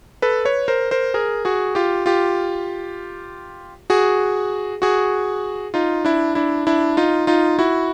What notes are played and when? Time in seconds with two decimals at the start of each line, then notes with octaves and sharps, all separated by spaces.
0.22 A4 B4
0.45 B4 C#5
0.68 A#4 C5
0.91 A#4 C5
1.14 G#4 A#4
1.45 F#4 G#4
1.75 F4 G4
2.06 F4 G4
3.90 F#4 G#4
4.82 F#4 G#4
5.74 D#4 F4
6.05 D4 E4
6.35 D4 E4
6.67 D4 E4
6.97 D#4 F4
7.27 D#4 F4
7.59 E4 F#4